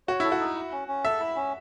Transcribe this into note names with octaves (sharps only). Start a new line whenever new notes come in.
F#4 C#5
E4 A4
F#4
D#4
E4
C#4
C#4
A4 E5
E4
C#4